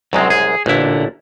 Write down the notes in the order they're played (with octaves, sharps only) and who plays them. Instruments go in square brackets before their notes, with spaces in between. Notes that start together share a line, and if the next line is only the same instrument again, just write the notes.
[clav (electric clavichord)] C2 F#2 G#3 [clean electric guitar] F#3 C4
[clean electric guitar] G#4
[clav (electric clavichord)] A1 E4 [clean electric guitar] A#2 D3